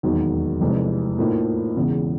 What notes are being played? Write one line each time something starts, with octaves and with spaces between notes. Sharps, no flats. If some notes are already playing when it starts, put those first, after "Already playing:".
E1 D#2 D#3 F#3
F1 F2 C3 E3 G#3
A2 F3 A#3 D#4
E1 E2 C#3